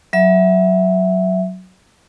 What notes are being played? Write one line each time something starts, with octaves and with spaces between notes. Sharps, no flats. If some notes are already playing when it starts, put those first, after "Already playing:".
F#3 E5